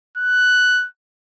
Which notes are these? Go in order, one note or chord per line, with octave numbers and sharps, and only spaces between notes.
F#6